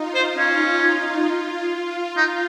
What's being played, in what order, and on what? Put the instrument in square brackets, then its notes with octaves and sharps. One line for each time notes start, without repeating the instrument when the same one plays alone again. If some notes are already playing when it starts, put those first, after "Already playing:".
Already playing: [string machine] D#4 F4
[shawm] C5
C#4
[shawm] D#4 [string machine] F4